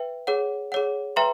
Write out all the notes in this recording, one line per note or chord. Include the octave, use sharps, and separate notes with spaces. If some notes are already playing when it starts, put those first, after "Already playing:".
Already playing: B4 E5 G5
G#4 C#5 F#5
G#4 C#5 F#5
B4 E5 G5 A#5 C6